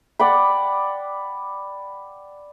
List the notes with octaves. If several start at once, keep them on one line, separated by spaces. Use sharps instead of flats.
D5 F#5 G5 B5